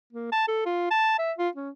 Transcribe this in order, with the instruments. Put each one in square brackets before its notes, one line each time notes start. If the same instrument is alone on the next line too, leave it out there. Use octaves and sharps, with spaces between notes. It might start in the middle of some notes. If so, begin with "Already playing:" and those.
[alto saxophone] A#3
A5
A4
F4
A5
E5
F4
C#4